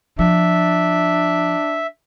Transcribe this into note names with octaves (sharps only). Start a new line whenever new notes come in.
F3 D4 E5